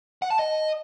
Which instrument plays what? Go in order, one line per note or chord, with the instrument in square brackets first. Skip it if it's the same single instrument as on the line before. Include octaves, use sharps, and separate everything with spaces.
[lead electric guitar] F#5
A5
D#5